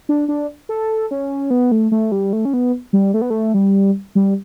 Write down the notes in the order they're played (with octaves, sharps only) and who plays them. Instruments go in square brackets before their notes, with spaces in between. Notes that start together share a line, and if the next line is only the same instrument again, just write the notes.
[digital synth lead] D4
D4
A4
C#4
B3
A3
A3
G3
A3
C#4
B3
G3
A3
B3
A3
G3
G3